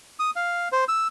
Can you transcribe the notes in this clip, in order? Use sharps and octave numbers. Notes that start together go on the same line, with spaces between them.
D#6
F5
C5
E6